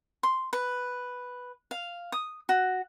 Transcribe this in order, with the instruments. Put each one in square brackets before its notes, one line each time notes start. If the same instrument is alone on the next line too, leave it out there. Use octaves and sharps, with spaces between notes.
[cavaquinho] C6
B4
F5
D#6
F#4